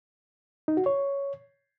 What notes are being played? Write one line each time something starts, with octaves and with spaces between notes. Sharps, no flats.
D#4
F#4
C#5